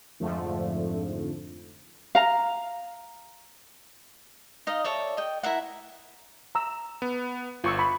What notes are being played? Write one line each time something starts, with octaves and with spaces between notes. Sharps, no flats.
F2 G#2 D3 F3 A3
F5 A#5
D#4 D#5 F5
A4 C#5 D5 E5
D#5 G5
E4 A#4 E5 F#5
A#5 E6
B3
G1 F4 C#6 E6
B5 C#6